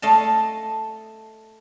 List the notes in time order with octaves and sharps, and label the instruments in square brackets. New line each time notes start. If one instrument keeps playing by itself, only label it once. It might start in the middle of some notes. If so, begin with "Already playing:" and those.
[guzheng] A3 D#5 F5 A5